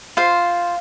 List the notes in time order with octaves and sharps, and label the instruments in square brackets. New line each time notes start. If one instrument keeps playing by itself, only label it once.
[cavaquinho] F4 C5 F5